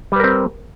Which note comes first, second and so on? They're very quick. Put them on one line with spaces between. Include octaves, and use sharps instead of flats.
G3 B4 A#4 C4